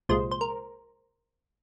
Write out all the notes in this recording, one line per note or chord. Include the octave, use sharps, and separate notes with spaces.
C2 A#2 F3 G#3 C5
C5
A#4